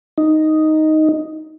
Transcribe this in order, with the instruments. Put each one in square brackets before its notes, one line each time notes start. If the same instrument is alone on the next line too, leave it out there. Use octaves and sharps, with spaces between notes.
[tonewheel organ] D#4